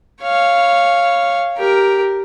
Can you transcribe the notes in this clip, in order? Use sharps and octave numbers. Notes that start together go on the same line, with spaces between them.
C#5 F5
G4 A#4